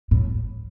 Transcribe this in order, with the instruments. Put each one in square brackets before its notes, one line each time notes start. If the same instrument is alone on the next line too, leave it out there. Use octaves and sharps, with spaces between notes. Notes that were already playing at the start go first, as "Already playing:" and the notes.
[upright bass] A2